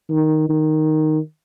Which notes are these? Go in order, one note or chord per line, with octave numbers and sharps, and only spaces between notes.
D#3
D#3